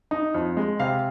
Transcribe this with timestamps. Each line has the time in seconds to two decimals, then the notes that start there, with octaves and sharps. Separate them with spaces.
0.11 D#4
0.34 F2
0.57 G#3
0.80 C3 F5